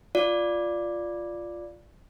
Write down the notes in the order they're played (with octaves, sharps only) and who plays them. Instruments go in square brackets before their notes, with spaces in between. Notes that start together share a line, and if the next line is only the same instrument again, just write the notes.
[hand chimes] F4 D5